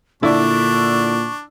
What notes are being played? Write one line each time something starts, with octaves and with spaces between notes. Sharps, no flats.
A#2 D3 D4 E4 D5 C#6